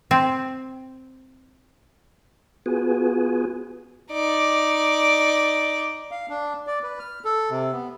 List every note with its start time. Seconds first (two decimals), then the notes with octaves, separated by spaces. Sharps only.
0.11 C4
2.66 B3 F4 F#4 G#4 B4 G#5
4.12 D#4 D5
6.11 F5
6.29 D4
6.67 D5
6.83 B4
6.99 F6
7.25 A4
7.50 C3
7.73 B3